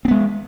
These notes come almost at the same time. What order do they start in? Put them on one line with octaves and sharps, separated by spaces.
C4 B3 G#3